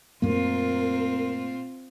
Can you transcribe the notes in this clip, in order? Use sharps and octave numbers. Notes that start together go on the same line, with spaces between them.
F#2 A#2 A3 A#3 C4 F4 A#4